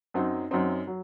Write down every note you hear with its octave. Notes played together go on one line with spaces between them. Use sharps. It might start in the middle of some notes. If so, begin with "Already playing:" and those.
F#2 F#3 C4 D#4
F#2 F#3 C4 D#4
F#3